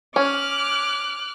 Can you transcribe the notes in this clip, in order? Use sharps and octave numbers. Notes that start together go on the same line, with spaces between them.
C#4 D6 F6 F#6